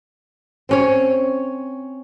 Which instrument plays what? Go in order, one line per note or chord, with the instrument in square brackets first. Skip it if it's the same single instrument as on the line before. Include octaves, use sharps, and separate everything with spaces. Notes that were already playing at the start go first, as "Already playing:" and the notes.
[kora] C4 C#4 C#5